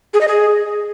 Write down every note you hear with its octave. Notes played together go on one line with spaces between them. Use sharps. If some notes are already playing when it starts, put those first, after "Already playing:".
G#4
D#5
G#4